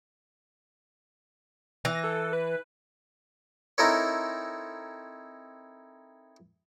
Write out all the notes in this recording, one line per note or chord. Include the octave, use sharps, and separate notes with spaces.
E3 A#6
A4
B4
C4 D#4 E4 A4 A#4 C#5